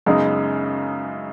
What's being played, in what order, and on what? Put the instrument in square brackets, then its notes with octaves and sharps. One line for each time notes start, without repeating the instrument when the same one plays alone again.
[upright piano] F#2 C#3 G#3 B3 D#4